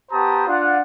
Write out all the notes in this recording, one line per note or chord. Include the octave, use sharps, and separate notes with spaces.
B3 G4 C5 A5 A#5 D#6
D4 F4 F#5